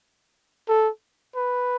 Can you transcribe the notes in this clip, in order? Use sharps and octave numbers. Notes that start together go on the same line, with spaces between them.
A4
B4